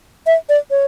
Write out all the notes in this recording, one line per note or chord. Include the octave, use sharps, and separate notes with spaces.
E5
D5
C#5